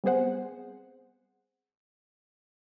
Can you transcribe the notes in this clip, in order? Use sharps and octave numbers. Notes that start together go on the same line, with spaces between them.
G3 B3 C4 G#4 C5 F#5